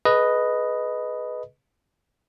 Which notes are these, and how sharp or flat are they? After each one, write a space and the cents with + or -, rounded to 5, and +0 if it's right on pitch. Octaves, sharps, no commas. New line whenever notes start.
G#4 +35 B4 +0 D#5 +0